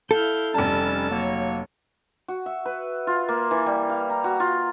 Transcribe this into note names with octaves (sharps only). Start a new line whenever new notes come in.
E4 A4 F5 G6
F1 G3 C#4 A5 E6 A6
F#3 A#3 C#5
F#4
E5
B4
F4
A#3
E3
G3
F5
A#5
F#4
F4